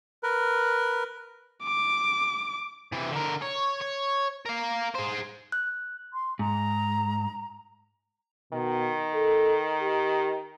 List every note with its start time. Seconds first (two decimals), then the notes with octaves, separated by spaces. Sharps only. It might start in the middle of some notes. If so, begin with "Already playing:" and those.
0.23 A#4 B4
1.64 D6
2.92 C3 E3
3.12 D3 A#4
3.42 C#5
3.82 C#5
4.46 A#4 F5
4.95 G#4 C5
5.52 F#6
6.13 C6
6.39 G#2 A#5
8.53 B2 D#3
9.14 A4
9.81 G4